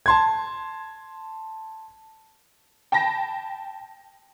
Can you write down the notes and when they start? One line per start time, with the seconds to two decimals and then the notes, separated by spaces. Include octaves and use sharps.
0.06 A5 C6 G#6
2.92 G5 A5 B5 A#6